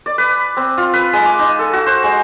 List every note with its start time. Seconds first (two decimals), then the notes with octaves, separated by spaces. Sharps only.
0.06 D5
0.18 B4
0.57 C4
0.77 F4
0.93 B4
1.13 G#3
1.26 D6
1.39 D#4
1.59 A4
1.73 F#4
1.87 C5
2.04 G#3